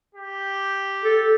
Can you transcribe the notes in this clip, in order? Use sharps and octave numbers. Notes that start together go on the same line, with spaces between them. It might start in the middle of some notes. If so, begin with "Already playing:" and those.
G4
A4